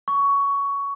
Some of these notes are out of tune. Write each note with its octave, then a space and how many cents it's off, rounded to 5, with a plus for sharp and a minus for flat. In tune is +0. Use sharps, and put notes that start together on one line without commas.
C#6 +15